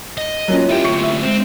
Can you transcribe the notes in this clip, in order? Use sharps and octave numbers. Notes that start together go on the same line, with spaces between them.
D#5
F#3 A#3 C#4 F4
C#2 E4 G4 G5
D2 C3 C#6 C#7
E5
G#3 C4